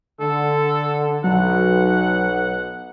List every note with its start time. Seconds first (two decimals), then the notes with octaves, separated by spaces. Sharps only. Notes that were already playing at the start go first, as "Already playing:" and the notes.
0.20 D3 A4
1.24 B1 F#3 F#5